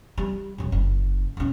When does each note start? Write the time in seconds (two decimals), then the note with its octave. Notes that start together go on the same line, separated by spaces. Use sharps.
0.18 G3
0.58 D#1 F#3
0.72 F#1
1.37 D#1 C#4